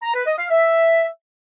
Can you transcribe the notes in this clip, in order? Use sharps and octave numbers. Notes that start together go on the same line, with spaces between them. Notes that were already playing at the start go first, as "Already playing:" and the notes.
A#5
B4
D#5
F5
E5